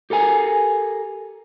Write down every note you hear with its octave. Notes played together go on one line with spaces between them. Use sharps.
G4 A4 A#4 G#5